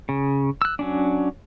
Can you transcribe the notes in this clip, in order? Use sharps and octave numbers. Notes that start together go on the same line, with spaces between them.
C#3
E6 F#6
F#3 C#4 D4